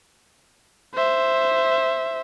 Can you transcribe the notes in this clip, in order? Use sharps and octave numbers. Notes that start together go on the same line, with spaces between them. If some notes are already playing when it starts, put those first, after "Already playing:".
C5 E5